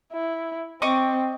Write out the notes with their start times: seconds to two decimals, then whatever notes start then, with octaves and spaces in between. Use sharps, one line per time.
0.12 E4
0.82 C4 D#5 C#6 D6